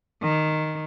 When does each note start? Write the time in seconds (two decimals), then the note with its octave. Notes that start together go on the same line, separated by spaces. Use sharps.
0.21 D#3